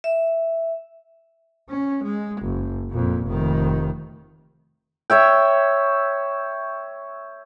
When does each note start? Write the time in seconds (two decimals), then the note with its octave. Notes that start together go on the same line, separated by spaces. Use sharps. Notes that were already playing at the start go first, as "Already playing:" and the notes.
0.04 E5
1.69 C#4
2.04 G#3
2.42 F#1
2.91 F2 A#2
3.26 F1 D#3
5.10 C#5 E5 G5